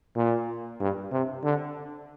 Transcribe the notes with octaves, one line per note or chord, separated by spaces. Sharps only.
A#2
G2
C3
D3